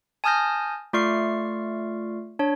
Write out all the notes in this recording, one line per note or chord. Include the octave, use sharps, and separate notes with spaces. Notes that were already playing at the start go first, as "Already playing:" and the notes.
G#5 A5 D#6 F6 G6 A#6
A3 F4 D5 C#6 F6 C7
D4 C#5